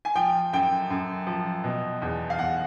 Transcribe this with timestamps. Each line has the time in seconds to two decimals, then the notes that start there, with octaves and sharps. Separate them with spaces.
0.05 G#5
0.15 F3 G5
0.53 F#2 G5
0.90 F#2
1.27 F3
1.64 B2
2.02 E2
2.30 F5
2.39 E2 F#5